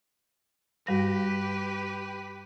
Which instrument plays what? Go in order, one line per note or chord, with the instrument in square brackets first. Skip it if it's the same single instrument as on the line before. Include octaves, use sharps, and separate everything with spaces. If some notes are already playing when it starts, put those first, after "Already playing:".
[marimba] G2 G3 A#6 [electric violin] G4 B4